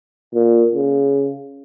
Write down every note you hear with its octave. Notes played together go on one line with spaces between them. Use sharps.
A#2
C#3